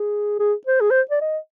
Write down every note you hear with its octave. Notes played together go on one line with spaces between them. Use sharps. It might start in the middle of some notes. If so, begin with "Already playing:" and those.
Already playing: G#4
G#4
C5
G#4
C5
D5
D#5